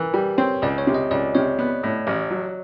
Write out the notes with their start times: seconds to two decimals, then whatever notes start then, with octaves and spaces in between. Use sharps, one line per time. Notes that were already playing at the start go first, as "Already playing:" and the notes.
Already playing: E3 A#4 B4
0.14 G3
0.38 C4 C#5
0.62 C#2 D5
0.78 C#5
0.87 C3
0.94 D#5
1.11 C#2 D5
1.35 C3 C#5
1.59 B3
1.83 A2
2.07 A1
2.31 F#3